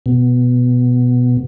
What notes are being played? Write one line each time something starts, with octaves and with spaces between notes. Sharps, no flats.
B2